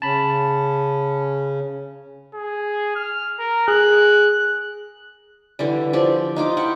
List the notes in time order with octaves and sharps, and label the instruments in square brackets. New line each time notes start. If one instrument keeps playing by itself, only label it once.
[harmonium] C#3 C#4 [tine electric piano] A5 B5
[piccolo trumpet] G#4
F6
A#4
[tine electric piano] G#4 [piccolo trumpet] F#6
[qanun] D3 E3 G3
F3 G4 D5
D#4 F4 D6
E4 F#5 G5